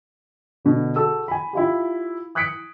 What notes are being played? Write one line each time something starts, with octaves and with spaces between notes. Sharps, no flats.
B2 D3
F#4 G#4 A4 E6
G#5 B5
E4 F4 G4
D#6 F#6 G#6 B6 C#7 D7